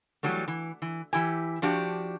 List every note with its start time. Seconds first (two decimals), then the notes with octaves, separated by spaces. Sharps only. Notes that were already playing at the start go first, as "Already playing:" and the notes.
0.23 E3 F#3 G3 A3
0.48 E3
0.82 E3
1.13 E3 E4 G4 G#5
1.62 F3 D4 F#4 G4